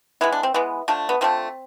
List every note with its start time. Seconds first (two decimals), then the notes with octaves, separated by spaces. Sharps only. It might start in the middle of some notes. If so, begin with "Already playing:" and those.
0.21 E3 G#3 B3 E4
0.32 D4
0.43 C4
0.54 E3 G#3 B3
0.88 D3 F3 A3
1.09 B3
1.21 D3 F3 A3 C4